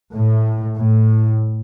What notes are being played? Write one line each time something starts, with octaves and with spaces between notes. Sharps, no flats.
A2
A2